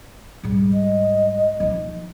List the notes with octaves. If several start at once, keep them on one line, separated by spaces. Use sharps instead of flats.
G#2 G3
D#5
F3 D#4